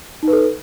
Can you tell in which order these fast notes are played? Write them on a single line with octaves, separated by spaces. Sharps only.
D#4 B4 A4